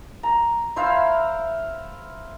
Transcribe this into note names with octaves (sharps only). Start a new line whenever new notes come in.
A#5
E4 C5 E5 F5